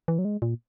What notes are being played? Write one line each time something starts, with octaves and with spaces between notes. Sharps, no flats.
E3
F#3
G#3
A#2